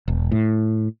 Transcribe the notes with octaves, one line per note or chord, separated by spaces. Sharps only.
E1
A2